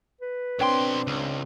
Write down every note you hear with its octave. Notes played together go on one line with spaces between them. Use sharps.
B4
B1 C4 D4 C#5 G5 C6
C#2